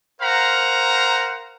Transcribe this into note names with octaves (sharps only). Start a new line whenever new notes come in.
A#4 C5 F5 F#5 A#5